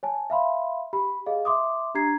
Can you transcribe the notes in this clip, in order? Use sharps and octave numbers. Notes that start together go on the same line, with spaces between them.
C#5 G#5 A5
E5 F5 B5 C6
G4 B5
G#4 D#5 F5
E5 C6 D6 D#6
D4 G4 A#5 G#6 C7